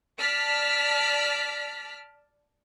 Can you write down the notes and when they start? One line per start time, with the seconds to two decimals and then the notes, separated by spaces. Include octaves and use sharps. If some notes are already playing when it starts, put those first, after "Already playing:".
0.19 D5 A5 F6 B6